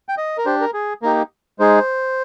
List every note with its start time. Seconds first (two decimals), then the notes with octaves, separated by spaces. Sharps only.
0.09 G5
0.18 D#5
0.38 A#4
0.45 D4 G4 C5
0.61 A#4
0.74 G#4
1.02 A#3 D#4 G4 A#4
1.59 G#3 D#4 G#4 C5